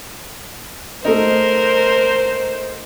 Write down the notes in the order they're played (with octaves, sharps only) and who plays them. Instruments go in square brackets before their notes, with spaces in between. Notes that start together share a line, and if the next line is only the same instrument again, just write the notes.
[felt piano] A3 D#4 [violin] A#4 [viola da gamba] C5